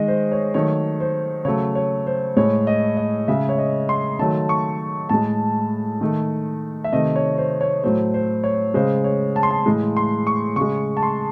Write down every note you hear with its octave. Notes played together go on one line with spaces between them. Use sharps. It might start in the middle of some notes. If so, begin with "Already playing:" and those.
Already playing: D#3 G#3 D#5
C5
C#5
D#3 F#3 A3 C#5
C5
C#3 F#3 A3 C#5
C#5
C5
A2 G#3 C#5
D#5
D#5
C#3 G#3 E5
C#5
D#5
C6
D#3 F#3 A3 A5
C#6
A2 G#3 A5
D#3 A3
E5
C3 D#3 A3 D#5
C#5
C5
C#5
A2 F#3 A3 C5
C5
C#5
C#3 G#3 C5
C#5
A5
C6
A5
A2 E3 G#3
C6
C#6
C#3 G#3 C#6
A5
C6